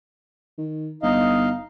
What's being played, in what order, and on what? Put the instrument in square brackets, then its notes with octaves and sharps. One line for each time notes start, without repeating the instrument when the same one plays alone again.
[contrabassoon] D#3
[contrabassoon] G1 [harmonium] D#4 D#5 F5